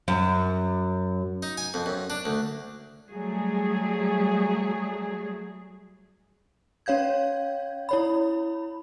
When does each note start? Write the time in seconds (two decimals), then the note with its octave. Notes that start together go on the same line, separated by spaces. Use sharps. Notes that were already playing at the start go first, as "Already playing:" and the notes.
0.08 F#2
1.43 D#4
1.57 G#5
1.74 F2
1.86 F#2
2.10 D4
2.25 D2
3.10 F#3 G3 A3 G#4
6.86 C#4 C#5 F5 G6 G#6
7.89 E4 C#5 B5